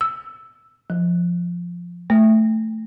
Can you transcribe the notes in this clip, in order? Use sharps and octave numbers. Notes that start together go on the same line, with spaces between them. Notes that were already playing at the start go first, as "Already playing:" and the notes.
E6
F3
A3